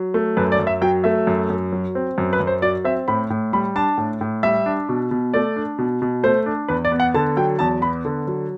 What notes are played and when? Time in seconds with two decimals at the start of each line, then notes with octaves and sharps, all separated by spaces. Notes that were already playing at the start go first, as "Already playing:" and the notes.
Already playing: F#3
0.14 A3
0.37 F#2 B4
0.52 D5
0.59 F#2
0.67 E5
0.82 F#3 G5
1.04 A3 E5
1.27 F#2
1.50 F#2
1.72 F#3
1.95 C4
2.18 F#2
2.33 B4
2.40 F#2
2.47 C5
2.62 F#3 D5
2.84 C4 E5
3.08 A2 B5
3.30 A2
3.53 G3 B5
3.76 D4 A5
3.98 A2
4.21 A2
4.43 G3 E5
4.66 D4
4.89 B2
5.11 B2
5.34 A3 D5
5.56 D4
5.78 B2
6.02 B2
6.23 A3 C5
6.46 D4
6.69 E2 B4
6.85 D5
6.92 B3
7.00 F#5
7.14 D3 A5
7.37 F#3 G5
7.59 E2 A5
7.82 B3 B5
8.05 D3
8.27 F#3